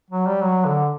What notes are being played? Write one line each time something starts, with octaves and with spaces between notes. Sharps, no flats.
F#3
G3
F#3
D3